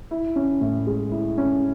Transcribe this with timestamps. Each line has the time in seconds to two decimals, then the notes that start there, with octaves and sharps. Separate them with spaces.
0.11 E4
0.36 C#4
0.61 A2
0.87 G#3
1.11 E4
1.38 C#4